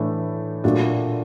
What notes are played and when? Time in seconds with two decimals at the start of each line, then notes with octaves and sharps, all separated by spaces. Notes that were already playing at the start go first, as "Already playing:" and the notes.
Already playing: A2 E3 A3 D4
0.64 A#2 F#3 A3 D4 F4